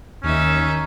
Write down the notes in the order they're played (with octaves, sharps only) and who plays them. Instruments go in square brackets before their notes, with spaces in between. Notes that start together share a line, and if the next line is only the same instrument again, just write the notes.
[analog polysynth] D#2 [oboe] C#4 [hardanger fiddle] D#4 E5